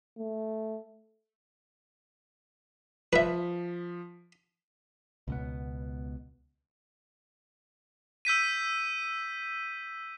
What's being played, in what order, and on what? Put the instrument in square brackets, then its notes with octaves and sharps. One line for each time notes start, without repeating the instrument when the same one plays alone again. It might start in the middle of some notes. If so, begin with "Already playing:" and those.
[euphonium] A3
[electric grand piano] F3 B6 [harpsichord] B4 E5
[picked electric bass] C#2 B2 B3
[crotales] E6 G6 B6 D#7